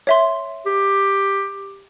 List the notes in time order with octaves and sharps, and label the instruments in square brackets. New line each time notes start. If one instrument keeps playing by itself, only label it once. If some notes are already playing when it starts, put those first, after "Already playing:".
[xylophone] C#5 E5 C6
[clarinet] G4